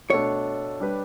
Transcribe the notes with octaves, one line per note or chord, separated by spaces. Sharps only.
B2 A3 D4 A4 C#5
G3 D4 G4 B4